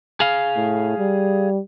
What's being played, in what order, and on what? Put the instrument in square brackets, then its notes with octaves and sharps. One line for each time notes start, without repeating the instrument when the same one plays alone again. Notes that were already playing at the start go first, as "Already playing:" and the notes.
[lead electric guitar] G#4 F5
[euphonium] A2
G3